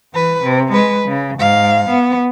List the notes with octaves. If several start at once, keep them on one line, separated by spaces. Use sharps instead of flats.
E3 B4
C3
G#3 B4
C#3
G#2 F5
B3